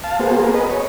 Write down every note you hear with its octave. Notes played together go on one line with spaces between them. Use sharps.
F5 A5
A#3 B3 F#4 G#4 C5
B3 G#4 A#4
B4 D#5
C#5